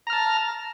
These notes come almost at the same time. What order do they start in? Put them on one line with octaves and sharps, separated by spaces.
A#5 F6 A5